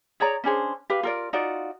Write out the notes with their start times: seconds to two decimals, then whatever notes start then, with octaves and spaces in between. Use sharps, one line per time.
0.20 G#4 C#5 D5 A#5
0.44 C#4 D4 G#4 C5
0.90 G4 B4 F5
1.03 F4 A#4 D5
1.33 D#4 F4 F#4 D5